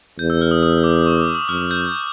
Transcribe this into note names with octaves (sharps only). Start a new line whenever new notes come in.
E2 G6
E6
F6
D#6
D#6
D6
C#6
D6
D#6
F2 F6
G6